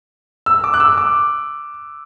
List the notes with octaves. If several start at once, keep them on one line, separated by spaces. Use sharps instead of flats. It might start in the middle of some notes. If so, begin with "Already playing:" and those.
E6
D6
F#6
E6
D6